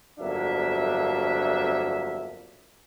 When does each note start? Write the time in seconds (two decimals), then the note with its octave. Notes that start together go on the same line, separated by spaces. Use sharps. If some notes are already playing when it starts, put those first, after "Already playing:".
0.20 G1 F2 F#3 A#3 D4 E5